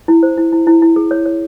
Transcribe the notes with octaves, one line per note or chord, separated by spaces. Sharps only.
E4
C5
E4
E4
E4
E4
G#4
C#5
C#5